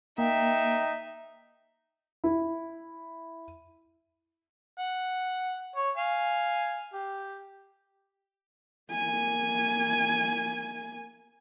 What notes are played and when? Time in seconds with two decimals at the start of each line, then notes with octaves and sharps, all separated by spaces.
0.18 A#3 D#4 E5 G5
2.24 E4
4.78 F#5
5.76 C#5
5.97 F5 G#5
6.93 G4
8.91 A#3 G#5